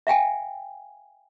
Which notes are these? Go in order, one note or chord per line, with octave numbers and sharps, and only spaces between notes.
E5 F5 G5 G#5